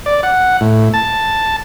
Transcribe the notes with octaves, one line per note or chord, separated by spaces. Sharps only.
D5
F#5
A2
A5